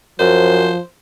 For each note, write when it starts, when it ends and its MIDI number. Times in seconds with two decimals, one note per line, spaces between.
0.19 0.71 42
0.19 0.79 53
0.19 0.85 72